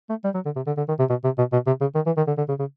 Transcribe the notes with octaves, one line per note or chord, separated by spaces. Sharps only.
A3
G3
F#3
D3
C3
D3
D3
D#3
C3
B2
C3
B2
B2
C3
C#3
D#3
E3
D#3
D3
D3
C#3
C#3